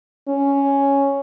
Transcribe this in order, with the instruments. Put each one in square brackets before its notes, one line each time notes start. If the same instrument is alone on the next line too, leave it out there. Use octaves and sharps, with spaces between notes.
[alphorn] C#4